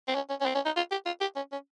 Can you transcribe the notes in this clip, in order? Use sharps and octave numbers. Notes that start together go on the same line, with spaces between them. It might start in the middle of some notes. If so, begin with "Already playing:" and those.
C4
C#4
C#4
C#4
C4
C#4
D#4
F4
G4
F4
G4
C#4
C#4